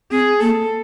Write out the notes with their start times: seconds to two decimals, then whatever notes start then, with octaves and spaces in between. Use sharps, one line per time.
0.11 C4 G#4
0.40 A#3 A4